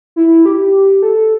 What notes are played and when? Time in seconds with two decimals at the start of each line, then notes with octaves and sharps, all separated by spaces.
0.16 E4
0.46 G4
1.02 A4